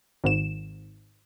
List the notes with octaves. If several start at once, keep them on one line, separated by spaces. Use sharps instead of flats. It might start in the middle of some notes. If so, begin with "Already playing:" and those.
G#1 G#2 E7